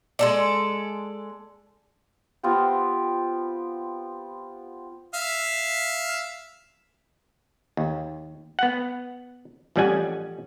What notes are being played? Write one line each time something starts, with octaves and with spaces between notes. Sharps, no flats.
G#3 A4 D5
B3 C4 F4 G4
E5 F5
D#2
B3 F#5
A1 F2 G3 C#4 F#5 G#5